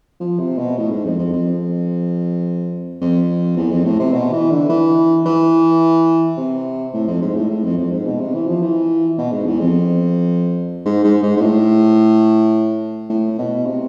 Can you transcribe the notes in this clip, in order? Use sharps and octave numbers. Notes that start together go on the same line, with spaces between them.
F3
C3
B2
A2
G#2
F2
F2
F2
F2
E2
F2
A2
C3
B2
E3
D3
E3
E3
C3
A2
F2
G#2
A2
A2
F2
F2
G#2
B2
C3
E3
F3
E3
B2
G#2
E2
F2
G#2
G#2
G#2
G#2
A2
A2
B2
C3